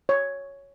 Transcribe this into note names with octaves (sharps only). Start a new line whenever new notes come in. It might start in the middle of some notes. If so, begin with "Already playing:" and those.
C#5